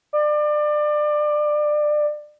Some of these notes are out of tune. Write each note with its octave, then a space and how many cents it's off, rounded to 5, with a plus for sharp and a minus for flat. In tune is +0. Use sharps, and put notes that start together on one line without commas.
D5 +25